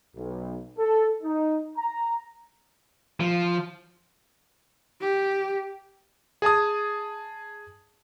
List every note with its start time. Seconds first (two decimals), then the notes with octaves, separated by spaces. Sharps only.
0.16 B1
0.78 A4
1.23 D#4
1.78 A#5
3.20 F3
5.01 G4
6.42 G#4 G#5 A5 D#6